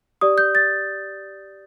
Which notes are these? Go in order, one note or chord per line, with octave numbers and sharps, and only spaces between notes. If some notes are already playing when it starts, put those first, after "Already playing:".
G4 D5 D#6
G6
A6